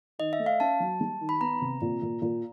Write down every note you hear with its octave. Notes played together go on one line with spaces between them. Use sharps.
D#3 D#5
E5
A3
F5
C#4 A5
F#3
G3
D#3
B5
B3 A#5
C3
A#2
A#2
A#2